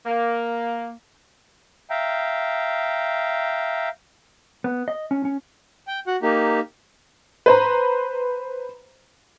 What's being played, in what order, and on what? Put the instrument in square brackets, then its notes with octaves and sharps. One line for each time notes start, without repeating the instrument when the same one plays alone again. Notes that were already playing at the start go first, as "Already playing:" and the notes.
[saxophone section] A#3
[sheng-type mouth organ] E5 F5 G5 A#5
[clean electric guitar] B3
D#5
C#4
C#4
[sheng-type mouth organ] G5
F#4 F#5
A#3 D#4 G4
[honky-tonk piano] B4 C5 A#5